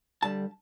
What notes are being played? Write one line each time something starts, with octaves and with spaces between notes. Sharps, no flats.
G2 D3 G3 A5